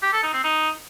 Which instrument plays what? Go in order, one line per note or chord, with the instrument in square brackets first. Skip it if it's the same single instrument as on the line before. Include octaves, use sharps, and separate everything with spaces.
[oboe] G4
A4
D#4
C4
D#4